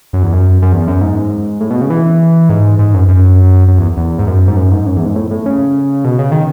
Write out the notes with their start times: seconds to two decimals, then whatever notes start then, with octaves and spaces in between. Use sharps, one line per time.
0.13 F#2
0.23 E2
0.33 F#2
0.62 F#2
0.72 E2
0.88 F#2
1.01 G#2
1.61 A2
1.71 B2
1.81 C#3
1.90 E3
2.49 G#2
2.79 G#2
2.94 F#2
3.08 F#2
3.68 F#2
3.78 E2
3.97 E2
4.19 G#2
4.27 F#2
4.48 G#2
4.56 F#2
4.72 G#2
4.86 F#2
4.96 E2
5.06 G#2
5.16 A2
5.31 A2
5.46 C#3
6.04 B2
6.19 C#3
6.32 D#3